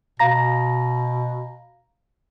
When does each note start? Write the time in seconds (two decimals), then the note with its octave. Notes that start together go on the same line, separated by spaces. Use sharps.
0.20 B2 F5 A#5 A#6